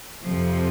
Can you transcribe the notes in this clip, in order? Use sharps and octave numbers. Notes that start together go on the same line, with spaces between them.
F2 C3 F3